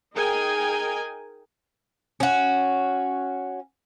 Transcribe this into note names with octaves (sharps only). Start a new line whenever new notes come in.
D#4 G#4 A#4 G5 G#5
C#4 F#4